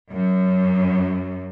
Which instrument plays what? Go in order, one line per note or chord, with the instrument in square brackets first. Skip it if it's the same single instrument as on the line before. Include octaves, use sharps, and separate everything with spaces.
[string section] F#2